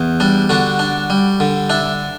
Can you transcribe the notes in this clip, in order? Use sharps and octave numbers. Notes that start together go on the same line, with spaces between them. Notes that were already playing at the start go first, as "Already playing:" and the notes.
Already playing: E2
G3 D4
D3 D4 F#4
D4
G3
D3
D4 E4